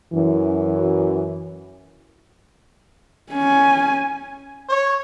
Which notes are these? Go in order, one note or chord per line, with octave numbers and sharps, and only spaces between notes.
F#2 E3
C#4 G#5
C#5